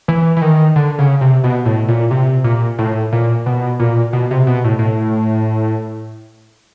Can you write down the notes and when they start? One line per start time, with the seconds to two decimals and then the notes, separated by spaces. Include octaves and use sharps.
0.08 E3
0.37 E3
0.42 D#3
0.76 D3
0.99 C#3
1.21 C3
1.44 B2
1.65 A2
1.88 A#2
2.11 C3
2.44 A#2
2.78 A2
3.13 A#2
3.46 B2
3.80 A#2
4.13 B2
4.31 C3
4.47 B2
4.64 A2
4.79 A2